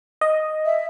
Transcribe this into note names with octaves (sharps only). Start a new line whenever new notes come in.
D#5
E5